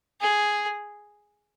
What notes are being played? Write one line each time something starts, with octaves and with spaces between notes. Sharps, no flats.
G#4